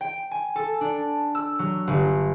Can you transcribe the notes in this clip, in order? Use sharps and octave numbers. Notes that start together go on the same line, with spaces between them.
G5
G#5
A4
D4
E6
F#3
G1